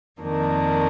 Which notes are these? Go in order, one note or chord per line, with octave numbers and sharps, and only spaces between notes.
F2 D#3 A#3 D4